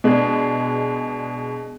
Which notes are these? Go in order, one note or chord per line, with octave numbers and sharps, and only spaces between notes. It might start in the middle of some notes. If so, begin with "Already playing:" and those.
B2 G#3 D4 G#4